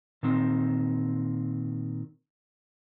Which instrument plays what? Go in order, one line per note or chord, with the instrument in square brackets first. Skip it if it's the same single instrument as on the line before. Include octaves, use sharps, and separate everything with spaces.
[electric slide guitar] A#2 D#3 C4